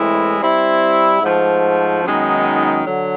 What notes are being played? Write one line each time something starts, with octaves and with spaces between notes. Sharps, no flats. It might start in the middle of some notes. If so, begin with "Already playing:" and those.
Already playing: A2 E3 G#3 C4 E4
G3 C4 E4
G#2 F3 A3
F#2 D#3 G#3 B3 D#4
D3 F#3